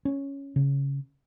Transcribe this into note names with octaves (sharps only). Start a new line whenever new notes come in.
C#4
C#3